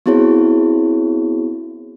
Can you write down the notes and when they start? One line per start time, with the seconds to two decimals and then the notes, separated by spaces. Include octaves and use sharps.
0.06 B3 C4 E4 F#4 G#4 C#5